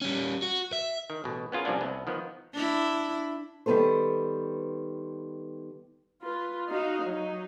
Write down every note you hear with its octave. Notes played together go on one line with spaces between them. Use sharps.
G3 C#4
F#4
E5
D#3
A1 B2
B3 C#4 F4 G#4 A#4
C3 F3 G3 A#3 C#4 D4
C2 B3
D#3 F3 B3
D4 E4
D#3 G3 B3 A4 C5
F4 B4
D#4 F#4 D#5 F5
F#3 D#4